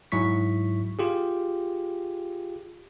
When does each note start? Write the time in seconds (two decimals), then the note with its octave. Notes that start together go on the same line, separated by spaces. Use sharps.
0.12 G#2 F#3 E4 C#6 B6
0.99 F4 G4 G#4